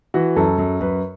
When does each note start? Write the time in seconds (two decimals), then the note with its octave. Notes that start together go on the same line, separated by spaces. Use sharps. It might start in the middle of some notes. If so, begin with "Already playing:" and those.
0.14 E3 F#4
0.36 F#2 A4
0.58 F#2
0.81 F#2 B4